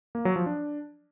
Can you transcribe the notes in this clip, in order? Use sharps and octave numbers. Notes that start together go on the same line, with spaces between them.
A#3
F#3
F3
D4